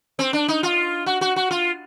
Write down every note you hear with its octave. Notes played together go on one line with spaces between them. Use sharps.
C4
D4
D#4
F4
F#4
F#4
F#4
F4